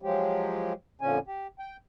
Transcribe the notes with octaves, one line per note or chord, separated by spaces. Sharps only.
F3 F#3 G#3 G4
F2 A#2 D3 F3 C#4 G#5
G4
G5